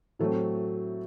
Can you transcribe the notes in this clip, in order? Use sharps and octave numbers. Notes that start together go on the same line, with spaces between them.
A2 F#3 A3 C4 A4